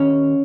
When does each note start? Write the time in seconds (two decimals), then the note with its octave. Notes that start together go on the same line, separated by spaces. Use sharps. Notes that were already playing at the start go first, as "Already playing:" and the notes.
Already playing: D#2 C#4